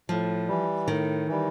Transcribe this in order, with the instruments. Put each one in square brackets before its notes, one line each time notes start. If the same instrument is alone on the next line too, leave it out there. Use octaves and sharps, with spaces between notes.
[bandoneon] A2 [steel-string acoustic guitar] F3
[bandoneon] E3 G3
[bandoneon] A2 [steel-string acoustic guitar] D#3
[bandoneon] E3 G3